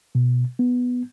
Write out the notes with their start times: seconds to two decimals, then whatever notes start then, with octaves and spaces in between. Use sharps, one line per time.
0.15 B2
0.59 B3